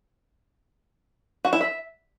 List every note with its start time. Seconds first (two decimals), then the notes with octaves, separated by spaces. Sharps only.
1.45 F#4
1.53 E4
1.61 E5